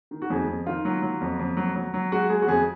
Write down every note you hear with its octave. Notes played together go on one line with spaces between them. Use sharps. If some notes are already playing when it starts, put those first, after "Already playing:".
D#3
F#4
F2 G#4
F2
D#3 F4
F#3
F#3
F2
F2
F#3
F#3
F#3
G#3 F#4
G#3 G#4
F#4
F2 G#4